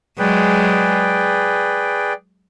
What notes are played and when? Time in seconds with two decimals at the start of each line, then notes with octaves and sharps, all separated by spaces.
0.18 F#3 G#3 G#4 B4 D5 G5